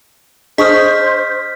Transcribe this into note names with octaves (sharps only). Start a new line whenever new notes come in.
D4 G#4 C5 D#5 C#6 D#6 F6 B6